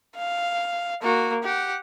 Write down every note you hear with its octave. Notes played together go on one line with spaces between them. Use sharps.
F5
A#3 F#4
G4 F#5